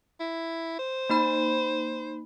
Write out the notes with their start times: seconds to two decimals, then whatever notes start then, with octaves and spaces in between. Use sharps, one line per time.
0.20 E4
0.79 C5
1.10 A#3 D#4 B5